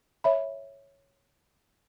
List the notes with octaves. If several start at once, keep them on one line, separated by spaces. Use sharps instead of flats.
C#5 E5 B5